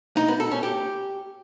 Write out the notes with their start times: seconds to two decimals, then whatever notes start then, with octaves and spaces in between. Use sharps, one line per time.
0.17 D#4
0.28 B3
0.40 A4
0.51 C#4
0.63 G4